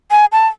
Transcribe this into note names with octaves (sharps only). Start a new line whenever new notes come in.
G#5
A5